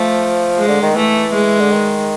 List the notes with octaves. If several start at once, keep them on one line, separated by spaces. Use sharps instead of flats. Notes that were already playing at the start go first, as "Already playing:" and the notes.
Already playing: F3 A3
G#3
D3
D#3
E3 A3
G#3
D3
D#3